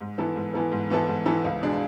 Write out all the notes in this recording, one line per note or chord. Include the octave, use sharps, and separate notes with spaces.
G#2
E3 B3 E4 A4
G#2
E3 B3 E4 A4
G#2
E3 B3 E4 A4
G#2
E3 B3 E4 A4
C#2
B2 G#3 D4